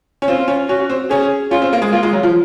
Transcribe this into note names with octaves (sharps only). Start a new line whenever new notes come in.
C#4
C4 F4
C#4
C#4 F#4
C4
C#4 G#4
C#4 F4
C4
A#3
G#3
A#3 F4
G#3
F#3
F3